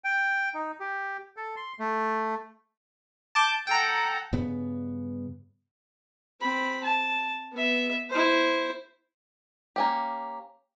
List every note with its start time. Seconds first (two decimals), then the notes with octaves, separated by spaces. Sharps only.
0.04 G5
0.55 D#4
0.80 G4
1.37 A4
1.56 C6
1.79 A3
3.35 A5 D6 G6
3.67 A4 F#5 G5 A#5
4.33 G2 C#3 B3
6.41 C4 B5
6.84 A5
7.52 B3 E5
8.10 E4 C5
9.76 A#3 C#4 G4